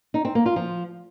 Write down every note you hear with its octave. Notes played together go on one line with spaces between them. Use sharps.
D#4
C4
A#3
F4
F3